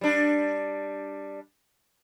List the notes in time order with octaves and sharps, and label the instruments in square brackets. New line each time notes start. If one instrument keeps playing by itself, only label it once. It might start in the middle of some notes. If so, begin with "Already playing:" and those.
[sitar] G3 D4